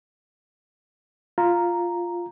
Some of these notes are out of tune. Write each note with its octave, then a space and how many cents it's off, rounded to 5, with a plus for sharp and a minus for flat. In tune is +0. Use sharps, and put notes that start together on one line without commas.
F4 +0 A#5 +0